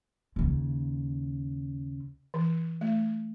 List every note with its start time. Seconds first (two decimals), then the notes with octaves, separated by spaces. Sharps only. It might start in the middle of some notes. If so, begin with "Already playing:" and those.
0.36 D#2 C#3
2.34 E3
2.81 A3